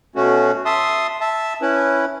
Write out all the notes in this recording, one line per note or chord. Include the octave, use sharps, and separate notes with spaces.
B2 A3 C#4 F#4
E5 A5 C6 D#6
E5 A5
C#4 E4 B4